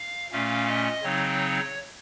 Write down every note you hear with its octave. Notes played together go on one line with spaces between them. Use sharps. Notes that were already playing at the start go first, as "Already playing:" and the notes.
Already playing: F5
A#2 A3 C#4 F5
D#5
C#3 F#3 C4 D#4 C#5